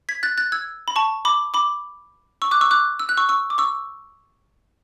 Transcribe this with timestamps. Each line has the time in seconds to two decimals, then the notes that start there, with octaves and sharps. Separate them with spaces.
0.09 G#6 B6
0.23 F#6 A6
0.38 F#6 A6
0.52 E6 G#6
0.88 B5
0.96 A5 C#6
1.25 B5 D6
1.54 B5 D6
2.42 C#6 E6
2.51 D6 F#6
2.61 C#6 E6
2.71 D6 F#6
2.99 E6
3.09 F#6
3.17 C#6 E6
3.29 C#6 E6
3.50 D6
3.58 C#6 E6